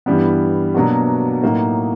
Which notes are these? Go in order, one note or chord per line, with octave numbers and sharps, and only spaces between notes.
G2 E3 G3 B3
B2 F#3 A#3 D4 F#4
A2 F#3 A#3 D#4